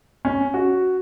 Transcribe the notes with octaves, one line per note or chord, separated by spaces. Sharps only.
C#4
F#4